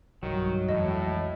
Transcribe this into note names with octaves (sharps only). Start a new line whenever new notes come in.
B1 G2 D#3 F#3
F2 A2 E3 G#3 D#5